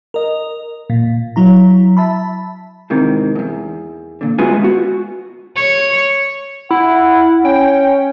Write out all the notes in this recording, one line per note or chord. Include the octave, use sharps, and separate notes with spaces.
A#4 D#5
A#2
F#3 E4 A#5
E5 A5 B5
G#2 C3 D#3 E3
E2 G2
A#2 D3
G#3 B3 F4 F#4 B4 G#5
B3 F#4
C#5
E4 F#5
C#4 G5